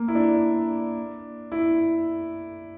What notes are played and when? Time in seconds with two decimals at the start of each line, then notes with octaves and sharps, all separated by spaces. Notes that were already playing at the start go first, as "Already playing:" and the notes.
Already playing: A#3
0.08 E4
0.15 D4
1.52 E4